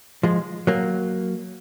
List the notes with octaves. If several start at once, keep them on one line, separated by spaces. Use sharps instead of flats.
F3 G#3
F#3 A#3